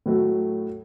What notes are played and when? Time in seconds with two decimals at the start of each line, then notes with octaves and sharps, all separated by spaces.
0.06 A2 F#3 A3